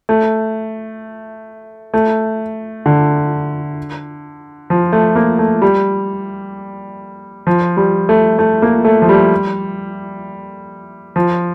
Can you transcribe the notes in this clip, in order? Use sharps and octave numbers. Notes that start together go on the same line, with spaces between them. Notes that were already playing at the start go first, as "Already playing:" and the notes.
A3
A3
D3
F3
A3
A#3
A3
G3
F3
G3
A3
A3
A#3
A3
F3
G3
F3